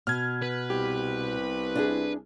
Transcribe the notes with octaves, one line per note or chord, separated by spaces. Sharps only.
B2 F6 G#6
B4
C2 G4
D4 E4 G#4